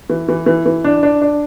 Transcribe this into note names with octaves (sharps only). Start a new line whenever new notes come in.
E3
E3
E3
E3
D4
D4
D4